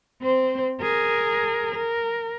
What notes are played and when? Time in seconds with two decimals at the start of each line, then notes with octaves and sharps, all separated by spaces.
0.22 C4 C5
0.81 G#4 A#4
1.75 A#4